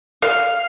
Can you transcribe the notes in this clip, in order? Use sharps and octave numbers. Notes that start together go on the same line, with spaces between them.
F5